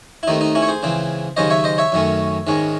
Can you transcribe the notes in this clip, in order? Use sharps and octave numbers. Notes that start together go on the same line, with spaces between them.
E4
D#2 D#3 A3 C4 D#4
D#4
C#4 E4
C#5
G#4 C5
C#2 C#3 E3 C4
D#2 C#3 F#3 C#4 C5 D#5
C#5 E5
C5 D#5
C#5 E5
F#2 D#3 A3 C#4
G#2 D#3 G#3 C#4